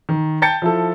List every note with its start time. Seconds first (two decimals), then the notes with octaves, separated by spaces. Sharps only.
0.09 D#3
0.42 G5 A5 G6 A6 C#7
0.62 F3 E4 A4